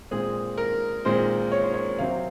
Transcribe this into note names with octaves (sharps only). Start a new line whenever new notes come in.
A#2 G#3 C4 G#4
A#4
A#2 G#3 C4 C5
C#5
C5
C#5
C3 F#3 C4 F5